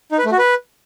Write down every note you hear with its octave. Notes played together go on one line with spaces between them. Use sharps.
D#4
B4
A3
F#4
B4